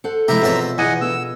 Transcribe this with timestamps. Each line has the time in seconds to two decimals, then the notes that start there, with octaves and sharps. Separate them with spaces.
0.04 A4 C5 F#5
0.28 C3 F3 G#3 E4 G4 E5 A#5
0.42 E2 B2 C4 F4 A4 B4 C#5 A5
0.78 E2 E3 E4 D#5 F#5 G#5 D#7
1.01 B3 A4 F#5 E6